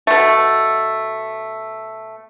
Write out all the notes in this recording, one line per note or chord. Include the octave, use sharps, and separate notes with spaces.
B2 A3